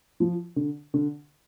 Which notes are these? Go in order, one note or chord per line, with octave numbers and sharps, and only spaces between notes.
F3
D3
D3